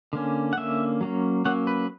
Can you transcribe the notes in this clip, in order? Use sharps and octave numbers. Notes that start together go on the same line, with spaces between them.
D3 A#3 C#4
F#5
D3 A#3 C#4 E5
F#3 A#3 C#4
F#3 A#3 C#4 F#5
B4